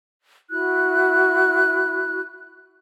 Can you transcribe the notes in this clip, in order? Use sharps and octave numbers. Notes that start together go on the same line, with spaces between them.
E4 F#4 F#6